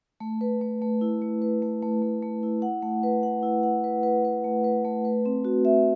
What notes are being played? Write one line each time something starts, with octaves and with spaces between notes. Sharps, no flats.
A3
B4
A3
A3
E4
A3
B4
A3
A3
A3
A3
E4
F#5
A3
B4
F#5
E4
F#5
B4
B4
B4
A3
B4
A3
B4
C4
F#4
E5